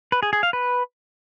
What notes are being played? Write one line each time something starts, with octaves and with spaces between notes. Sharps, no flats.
B4
G#4
G#4
F5
B4